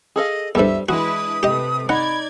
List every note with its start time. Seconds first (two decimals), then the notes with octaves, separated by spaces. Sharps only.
0.16 G#4 A4 D#5 F5
0.55 E2 G2 G3 A4 C5 E5
0.89 E3 G#3 D4 E4 F#4 B4 D#6
1.43 C3 A3 G4 B4 D#5
1.89 D#4 D5 F#5 B5 G#6